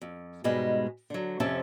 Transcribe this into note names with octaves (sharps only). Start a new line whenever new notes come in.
F2
G#2 B2 G3 G#3
D3 F#3
F2 C3 C#4 C5 E5 A5